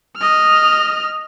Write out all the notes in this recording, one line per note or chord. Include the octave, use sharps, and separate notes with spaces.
D#5 F6